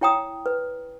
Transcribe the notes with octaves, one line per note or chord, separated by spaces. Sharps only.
E4 C#5 G5 A#5 D#6
B4